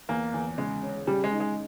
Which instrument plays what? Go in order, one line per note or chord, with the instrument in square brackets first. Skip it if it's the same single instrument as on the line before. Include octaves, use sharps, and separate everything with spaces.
[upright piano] E2 [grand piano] A#3
[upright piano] E2
[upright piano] C#3 [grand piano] G#3
[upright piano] C#4
[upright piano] C#3 [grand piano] G3
[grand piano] G#3
[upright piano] D#4
[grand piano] G#3